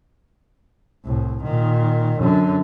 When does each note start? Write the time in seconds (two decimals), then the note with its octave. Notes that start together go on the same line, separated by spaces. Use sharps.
1.05 C2 A2
1.43 A#2 D#3
2.20 F#2 D3